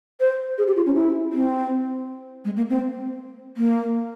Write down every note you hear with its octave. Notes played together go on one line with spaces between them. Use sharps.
C5
G#4
G4
F4
C#4
E4
C4
G#3
A#3
C4
A#3